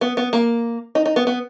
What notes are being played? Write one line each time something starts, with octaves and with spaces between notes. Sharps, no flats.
B3
B3
A#3
D#4
D#4
B3
B3